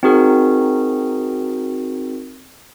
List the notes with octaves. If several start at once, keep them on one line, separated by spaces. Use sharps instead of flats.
C4 D#4 F#4 G#4 A#4